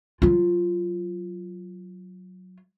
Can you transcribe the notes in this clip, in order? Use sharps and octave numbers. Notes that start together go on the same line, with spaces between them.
F#3 F4